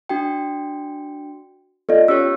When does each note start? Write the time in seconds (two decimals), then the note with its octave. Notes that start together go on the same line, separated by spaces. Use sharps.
0.09 D4 F#4 G5
1.89 B3 F4 A4 D5 D#5
2.08 C#4 G4 C#5 E6